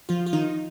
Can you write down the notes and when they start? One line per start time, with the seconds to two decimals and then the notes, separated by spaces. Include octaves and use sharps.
0.09 F3 F4
0.26 F4
0.33 D#3 D#4